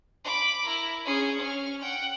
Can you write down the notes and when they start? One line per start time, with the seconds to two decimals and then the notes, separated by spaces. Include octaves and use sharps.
0.24 B5 D6
0.64 E4 A#4
1.05 C#4 G#4
1.38 C#4 F6
1.81 F#5 G5